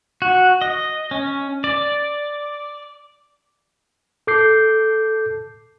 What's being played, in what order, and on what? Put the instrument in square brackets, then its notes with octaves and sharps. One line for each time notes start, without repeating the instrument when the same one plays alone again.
[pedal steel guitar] F#4
D#5
C#4
D5
[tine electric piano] A4 D6 G6 C7